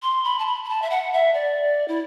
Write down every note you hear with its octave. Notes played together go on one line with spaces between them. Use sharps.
C6
B5
A5
B5
B5
A5
E5
F#5
E5
D5
E4